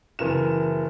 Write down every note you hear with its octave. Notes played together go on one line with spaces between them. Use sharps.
F#1 E3 A#4 E7